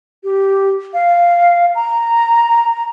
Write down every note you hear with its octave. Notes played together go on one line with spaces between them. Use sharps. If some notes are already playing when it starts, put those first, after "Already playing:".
G4
F5
A#5